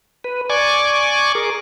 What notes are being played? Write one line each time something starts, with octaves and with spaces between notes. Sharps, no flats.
B4
D5 G#5 C#6 D6
G#4 A#4